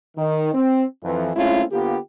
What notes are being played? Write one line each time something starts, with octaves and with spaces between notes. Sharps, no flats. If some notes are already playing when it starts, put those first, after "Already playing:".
D#3
C4
F2 E3
G#3 A3 C4 C#4 E4 F4
D3 A#3 B3 F4 G4